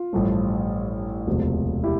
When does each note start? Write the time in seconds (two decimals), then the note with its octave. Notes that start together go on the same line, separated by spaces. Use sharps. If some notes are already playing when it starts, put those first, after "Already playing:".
Already playing: F4
0.13 A1 G2 F3 A3
1.27 E1 D2 C3 F3
1.84 E4 G4